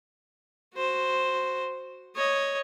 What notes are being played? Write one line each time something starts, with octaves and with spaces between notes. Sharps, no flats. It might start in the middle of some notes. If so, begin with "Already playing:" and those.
F#4 C5
C#5 D#5